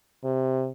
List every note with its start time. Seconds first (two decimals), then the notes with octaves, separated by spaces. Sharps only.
0.24 C3